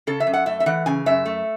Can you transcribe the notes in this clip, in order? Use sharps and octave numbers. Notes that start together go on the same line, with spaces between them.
C#3 A4
E5
F#2
F#5
A3 E5
E5
E3 F#5
C#3 G#5
F#2 E5
A3